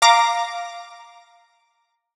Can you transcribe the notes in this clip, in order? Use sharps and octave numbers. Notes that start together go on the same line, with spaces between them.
F5 A#5 D6 A#6